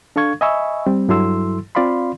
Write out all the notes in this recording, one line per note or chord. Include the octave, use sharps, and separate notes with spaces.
D4 A4 F5 C#6 G#6
D#5 E5 G#5 B5 C#6 E6
G3 C4
G2 F#3 E4 A4 C6 E6
C4 F4 D5 F5 B5 C6